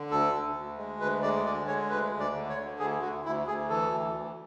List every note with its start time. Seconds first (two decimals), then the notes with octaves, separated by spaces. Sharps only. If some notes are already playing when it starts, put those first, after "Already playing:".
Already playing: D3
0.11 D2 A4
0.33 D2
0.56 D2
0.78 G#3
1.00 D2 B4
1.22 G#3 D5
1.45 D3 D5
1.67 G#3 C#5
1.90 D2 B4
2.12 D2
2.20 D5
2.35 D3
2.49 C#5
2.58 D3
2.79 D2 G#4
3.02 D2 F#4
3.25 D2 E4
3.47 D2 G#4
3.70 E3 A4
3.92 D2
4.14 D2